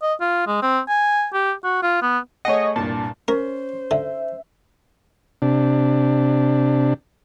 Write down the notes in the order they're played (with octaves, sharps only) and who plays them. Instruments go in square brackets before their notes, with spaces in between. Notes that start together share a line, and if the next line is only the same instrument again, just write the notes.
[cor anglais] D#5
F4
G#3
C4
G#5
G4
F#4
F4
B3
[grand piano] A3 G#4 F#5 [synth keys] C#5 D#5
[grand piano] C2 G2 A#2 [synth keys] A5
[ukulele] C#4 [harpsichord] A#4 [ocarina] C5
[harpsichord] D3 [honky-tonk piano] E5
[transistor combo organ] C3 D4